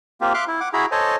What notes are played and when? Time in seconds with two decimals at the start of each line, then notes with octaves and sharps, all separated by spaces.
0.21 A#3 C4 F4 G4
0.34 E5 F5 C6 D6 F6 F#6
0.48 E4
0.61 F#5 D6
0.73 E4 F#4 G#4 A#5 B5
0.92 A4 C5 C#5 D#5 G#5 A5